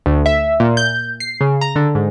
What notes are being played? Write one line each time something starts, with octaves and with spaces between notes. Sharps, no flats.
D2
E5
A#2
G6
C7
C#3
A#5
D3
G#2